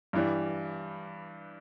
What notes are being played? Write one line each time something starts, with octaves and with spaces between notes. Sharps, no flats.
G2 E3 G3